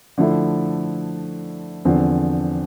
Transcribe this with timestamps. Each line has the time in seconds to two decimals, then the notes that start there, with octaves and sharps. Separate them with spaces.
0.18 D3 F3 A3 E4
1.85 E2 D3 F3 C4